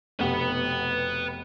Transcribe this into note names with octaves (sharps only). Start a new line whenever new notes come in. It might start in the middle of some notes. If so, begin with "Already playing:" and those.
F1 B2 G4 B4 F#5